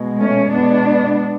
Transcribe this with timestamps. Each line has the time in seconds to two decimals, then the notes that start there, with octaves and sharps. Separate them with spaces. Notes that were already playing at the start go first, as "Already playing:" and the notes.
Already playing: B2 G#3
0.20 A3 C#4
0.52 B2 G#3 B3 D4